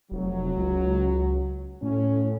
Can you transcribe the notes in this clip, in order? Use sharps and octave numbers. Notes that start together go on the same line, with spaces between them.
F1 F#3
C#2
A2 C#4